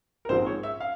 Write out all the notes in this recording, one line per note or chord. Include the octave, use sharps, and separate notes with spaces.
A#4
A#1 G#2 F3 G#3 C4 C5
C#5
E5
F5